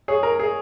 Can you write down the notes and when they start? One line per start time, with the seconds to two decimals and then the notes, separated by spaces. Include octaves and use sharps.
0.08 G#4 C#5
0.23 A#4
0.39 G#4